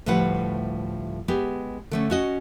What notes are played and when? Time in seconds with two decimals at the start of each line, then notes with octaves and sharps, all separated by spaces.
0.06 D2 A2 F3 G3 B4 F#5
1.28 G#3 B3 G4
1.91 D3 A3 C#4
2.10 C#4 F#4 D#5